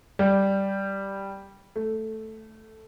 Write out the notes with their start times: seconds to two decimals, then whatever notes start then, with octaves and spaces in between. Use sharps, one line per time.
0.19 G3
1.76 A3